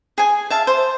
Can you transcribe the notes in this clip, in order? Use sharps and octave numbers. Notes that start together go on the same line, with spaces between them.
G#4 G#5
E5 F5 A5
C5